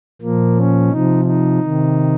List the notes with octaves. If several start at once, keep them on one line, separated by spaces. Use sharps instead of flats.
A#2 F3 A#3
C#4
C3 F3 D#4
D#4
C3 D#3